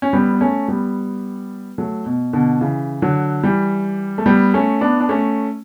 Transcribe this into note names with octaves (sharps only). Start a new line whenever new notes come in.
C#4
G3 B3
B3
A3 C#4
G3 B3
F#3 A3
B2
B2 D3
C#3 E3
D3 F#3
E3 G3
A3
G3 B3
A3 C#4
B3 D4
D4
A3 C#4